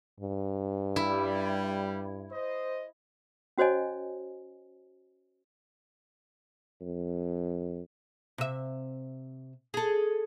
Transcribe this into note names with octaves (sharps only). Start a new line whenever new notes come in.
G2
G3 E4
C5 D#5
C#4 F#4 C5 C#5 D#5 G#5
F2
C3 E5
G#4 A4